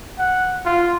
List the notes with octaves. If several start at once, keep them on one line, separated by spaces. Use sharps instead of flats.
F#5
F4